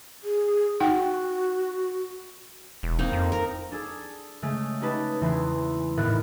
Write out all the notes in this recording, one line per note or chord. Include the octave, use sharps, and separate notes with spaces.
G#4
D#4 F#4 F#5 G5
E1
A#3 C4 D#4
F2
A#4
D4 G#4 A4
C#3 G#3 A3
C#4 D#4 G4 B4 D#5 A5
E2 C#3 E3 G#5 C6
G#1 A2 D#3 B3 A#4 F#6